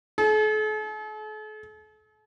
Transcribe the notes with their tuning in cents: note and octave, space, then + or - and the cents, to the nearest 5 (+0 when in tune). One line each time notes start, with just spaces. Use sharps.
A4 -45